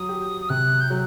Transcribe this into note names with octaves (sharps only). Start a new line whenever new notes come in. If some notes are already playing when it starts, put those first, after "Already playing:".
Already playing: F#3 D#6
G4
D#6
C3 F#6
G6
F#3 F#6